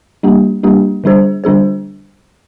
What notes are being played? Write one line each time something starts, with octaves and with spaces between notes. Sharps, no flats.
G3 A#3 D4 G4
G3 A#3 D4 G4
D3 G3 D4 G#4 C5
D3 G3 D4 G#4 C5